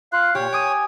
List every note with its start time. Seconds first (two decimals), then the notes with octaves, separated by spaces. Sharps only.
0.13 F4 F5 F#6
0.35 A#2 G4 C#5
0.53 G#5 D6 D#6 D#7